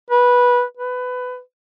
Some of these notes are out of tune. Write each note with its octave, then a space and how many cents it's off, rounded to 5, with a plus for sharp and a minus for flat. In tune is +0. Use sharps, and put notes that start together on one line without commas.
B4 -15
B4 +20